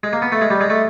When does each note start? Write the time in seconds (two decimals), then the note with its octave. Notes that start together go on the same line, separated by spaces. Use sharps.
0.03 G#3
0.13 A#3
0.22 B3
0.32 A3
0.41 G#3
0.51 G3
0.61 G#3
0.70 A3